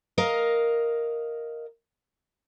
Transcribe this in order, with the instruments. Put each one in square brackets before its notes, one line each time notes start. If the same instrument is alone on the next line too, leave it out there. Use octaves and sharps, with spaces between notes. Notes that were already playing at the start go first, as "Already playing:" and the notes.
[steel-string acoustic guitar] A#4 D#5 F5